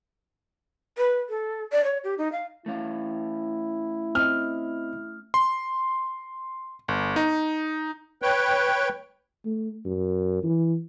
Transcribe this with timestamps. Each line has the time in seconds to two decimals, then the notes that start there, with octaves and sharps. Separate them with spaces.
0.98 B4
1.29 A4
1.72 D5
1.84 C#5
2.04 G4
2.18 D#4
2.32 F5
2.66 A3 C#4 E4 F5
4.15 C4 D#5 F6
5.34 C6
6.88 G1
7.16 D#4
8.22 B4 C#5 G5
9.45 A3
9.85 F#2
10.43 E3